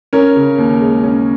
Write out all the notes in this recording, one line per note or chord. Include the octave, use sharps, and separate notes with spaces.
C#4 A#4 C#5
C#3
D#2
G#3
C#4